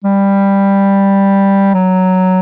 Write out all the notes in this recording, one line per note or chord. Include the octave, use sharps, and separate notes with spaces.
G3
F#3